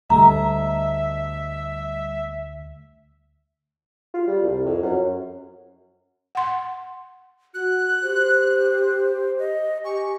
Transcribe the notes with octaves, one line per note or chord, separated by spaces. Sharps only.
D2 G3 A3 D#5 E5 A#5
F4
G3
C2
F2
F#2
F#5 C6
F#4 F#6
G4 C5
D#5
G4 G#5 C#6